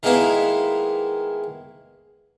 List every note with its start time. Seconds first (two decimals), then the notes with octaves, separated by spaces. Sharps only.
0.03 D#3 G#3 A#3 B3 D#4 E4